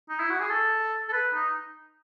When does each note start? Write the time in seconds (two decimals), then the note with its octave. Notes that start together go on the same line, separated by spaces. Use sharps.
0.09 D#4
0.19 E4
0.30 F#4
0.40 G#4
0.50 A4
1.09 A4
1.13 B4
1.34 D#4